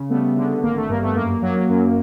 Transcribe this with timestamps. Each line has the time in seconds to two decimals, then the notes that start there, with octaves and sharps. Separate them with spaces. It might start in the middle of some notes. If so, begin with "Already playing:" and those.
Already playing: C#3
0.09 G3 A3 B3
0.36 D3
0.62 G#1 A#3
0.76 A3
0.89 G2 A#3
1.02 A3 B3
1.15 F#2 A#3
1.42 F#3
1.69 F#2